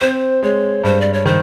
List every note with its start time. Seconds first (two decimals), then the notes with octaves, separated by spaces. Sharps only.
0.01 C4 C5
0.43 G#3 C#5
0.84 G2 C5
1.01 D5
1.13 C#5
1.26 D#3 C5